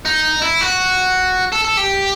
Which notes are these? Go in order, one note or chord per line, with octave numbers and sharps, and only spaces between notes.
D#4
E4
F#4
A4
A4
G4